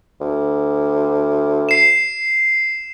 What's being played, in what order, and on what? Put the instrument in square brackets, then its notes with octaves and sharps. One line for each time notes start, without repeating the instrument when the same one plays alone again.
[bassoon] D2
[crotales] C7 E7